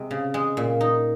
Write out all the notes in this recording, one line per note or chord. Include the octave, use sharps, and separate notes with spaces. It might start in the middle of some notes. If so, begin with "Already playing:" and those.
Already playing: C3 G#3
C#3
G#3
A#2
D#4